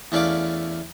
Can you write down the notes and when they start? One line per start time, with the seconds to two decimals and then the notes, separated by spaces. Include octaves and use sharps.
0.12 E2 A3 C#4 D5 F5 D6